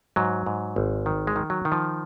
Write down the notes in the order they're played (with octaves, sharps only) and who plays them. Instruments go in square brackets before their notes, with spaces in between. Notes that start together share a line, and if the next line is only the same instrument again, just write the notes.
[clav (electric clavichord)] G#2 F#3
G#2
G#1
D#3
G#3
D#3
F#3
D#3
F3